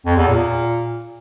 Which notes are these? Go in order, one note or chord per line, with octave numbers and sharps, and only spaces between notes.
F2
E2
A#2